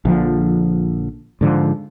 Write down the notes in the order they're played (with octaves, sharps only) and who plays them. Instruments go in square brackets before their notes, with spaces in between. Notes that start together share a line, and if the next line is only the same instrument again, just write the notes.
[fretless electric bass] A#1 D3 F3
G#2 D3 F3